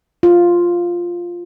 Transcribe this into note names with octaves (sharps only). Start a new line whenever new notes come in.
F4